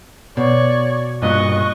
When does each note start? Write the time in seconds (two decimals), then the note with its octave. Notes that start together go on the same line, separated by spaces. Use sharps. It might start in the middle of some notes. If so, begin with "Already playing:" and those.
0.37 B2 C#5 D5 C#6
1.23 G2 A#2 D#5 C#6 F#6